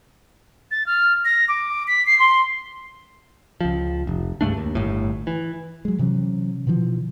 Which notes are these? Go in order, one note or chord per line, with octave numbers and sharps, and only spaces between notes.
A6
F6
A#6
D6
B6
C7
C6
C#2 F3
F1
C#2 G2 A3 D4
D#2
G1 A2
E3
F#3 G#3
C3 E3 F#3 C#4
B2 D3 E3 F3